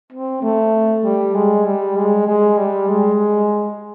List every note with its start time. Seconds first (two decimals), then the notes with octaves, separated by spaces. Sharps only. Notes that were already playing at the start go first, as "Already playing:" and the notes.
0.12 C4
0.42 A3
1.04 G3
1.35 G#3
1.66 G3
1.96 G#3
2.27 G#3
2.58 G3
2.89 G#3